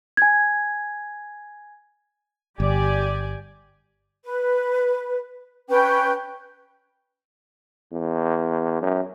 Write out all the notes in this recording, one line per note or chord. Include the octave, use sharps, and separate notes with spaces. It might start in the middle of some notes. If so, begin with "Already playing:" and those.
G#5 G#6
G1 G4 D5 G#5
B4
C#4 B4 G5
E2
F#2